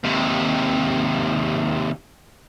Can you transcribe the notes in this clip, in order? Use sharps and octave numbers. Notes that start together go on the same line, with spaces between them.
D#2 C3